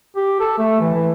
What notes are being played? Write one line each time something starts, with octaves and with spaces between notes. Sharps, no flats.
G4
A4
A3
E3
E3